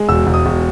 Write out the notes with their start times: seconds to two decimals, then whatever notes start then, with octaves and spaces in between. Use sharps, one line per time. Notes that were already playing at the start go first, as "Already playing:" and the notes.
Already playing: G#3
0.09 E1 E6
0.27 E1
0.34 D#6
0.46 E1